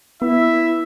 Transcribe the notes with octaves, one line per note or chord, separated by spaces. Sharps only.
B3 E4 E5